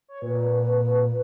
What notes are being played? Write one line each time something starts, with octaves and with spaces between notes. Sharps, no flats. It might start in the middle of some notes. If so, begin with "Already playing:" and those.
C#5
A#2 B4